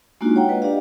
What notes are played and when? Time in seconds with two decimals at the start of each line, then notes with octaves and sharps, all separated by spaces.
0.21 G#3 A#3 D4 D#4 F4 F#4
0.36 C#5 F#5 G5 A#5
0.49 B4 D#5
0.62 D4 G4 D5 F5